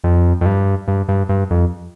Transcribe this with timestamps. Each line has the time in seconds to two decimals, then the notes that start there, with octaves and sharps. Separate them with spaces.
0.04 F2
0.41 F2
0.46 G2
0.88 G2
1.08 G2
1.29 G2
1.51 F2